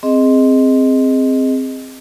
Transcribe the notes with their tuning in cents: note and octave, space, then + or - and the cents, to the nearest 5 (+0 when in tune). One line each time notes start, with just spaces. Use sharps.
C4 +0 G#4 +0 D#5 +0